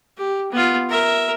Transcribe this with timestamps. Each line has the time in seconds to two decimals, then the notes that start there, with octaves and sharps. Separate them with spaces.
0.18 G4
0.52 B3 F4
0.89 A#4 E5